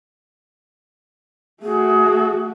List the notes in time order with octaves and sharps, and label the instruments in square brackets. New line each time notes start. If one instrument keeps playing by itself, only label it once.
[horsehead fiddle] A3 F#4 [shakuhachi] G#4